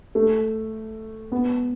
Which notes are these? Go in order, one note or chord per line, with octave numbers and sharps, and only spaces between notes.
A3
B3